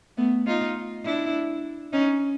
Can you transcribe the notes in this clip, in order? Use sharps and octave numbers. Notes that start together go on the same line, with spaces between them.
A3 B3
D#4 F4
D4 E4
C#4 D#4